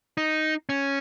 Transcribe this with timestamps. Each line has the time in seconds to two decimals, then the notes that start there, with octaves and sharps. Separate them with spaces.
0.17 D#4
0.69 C#4